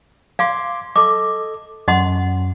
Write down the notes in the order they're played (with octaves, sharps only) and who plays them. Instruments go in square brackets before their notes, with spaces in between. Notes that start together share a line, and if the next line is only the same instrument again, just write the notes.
[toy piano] F5 [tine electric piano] C6 D6 G#6
[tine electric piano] A4 D#5 [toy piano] D6
[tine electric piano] F#2 [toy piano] D#5 F#5 C6